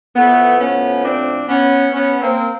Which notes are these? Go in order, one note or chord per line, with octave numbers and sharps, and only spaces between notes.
A2 F3 A3 B3
B3 C#4
C4 D4
B3 C#4
B3 C#4
A#3 C4